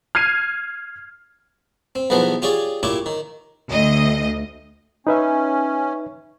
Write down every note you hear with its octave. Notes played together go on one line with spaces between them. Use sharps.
F6 G#6 C7 D#7
C4
B1 E2 E3 F3 B3 C5
F4 G4 G#4 C#5 D5
A#2 E4 G4 C#5 D6
D#3
D2 D#5
C#4 D#4 B4 E5